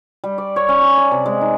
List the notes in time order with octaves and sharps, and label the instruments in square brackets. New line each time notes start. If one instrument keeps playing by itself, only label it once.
[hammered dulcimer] G3
D5
C#5
C#4
B5
D5
C3
G#3
D#4